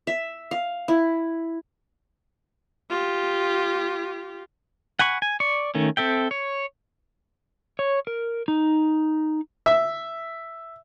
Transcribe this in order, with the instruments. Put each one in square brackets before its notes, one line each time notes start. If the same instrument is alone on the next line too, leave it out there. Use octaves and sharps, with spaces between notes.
[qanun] E5
F5
E4
[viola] F4 G4
[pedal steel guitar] F#5 G#5 B5 C#6
G#5
D5 C#6
D#3 A3 C#4
C4 A4 E5 G5
C#5
[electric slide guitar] C#5
A#4
D#4
[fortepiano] E5